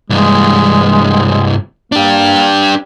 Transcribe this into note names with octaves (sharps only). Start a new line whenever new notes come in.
C2 G2 G#3
A#3 D4 G4